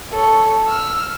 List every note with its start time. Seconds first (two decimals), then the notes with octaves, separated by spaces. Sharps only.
0.12 A4 C#5
0.67 E6 F6